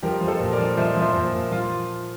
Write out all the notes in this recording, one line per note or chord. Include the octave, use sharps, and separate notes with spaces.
F3 G4 A#4
F3
A4 C5
A#2
A#4 D5
F3
F3 C5 E5
F3
C5 E5
A#2
A#2
F3 F4